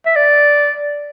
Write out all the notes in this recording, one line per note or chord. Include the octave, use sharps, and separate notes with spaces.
E5
D5